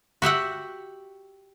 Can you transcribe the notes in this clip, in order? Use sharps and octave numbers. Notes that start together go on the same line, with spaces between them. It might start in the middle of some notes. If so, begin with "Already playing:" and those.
F#4 G4 E5 F#5